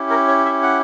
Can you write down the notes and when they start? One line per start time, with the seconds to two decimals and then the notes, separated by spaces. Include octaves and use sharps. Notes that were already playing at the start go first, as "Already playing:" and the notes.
Already playing: C#4 E4 G4
0.10 A#4
0.28 C#5
0.45 E5
0.63 F#5